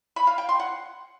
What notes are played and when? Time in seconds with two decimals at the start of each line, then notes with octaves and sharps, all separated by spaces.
0.16 B5
0.27 F5
0.38 G5
0.49 C6
0.60 F#5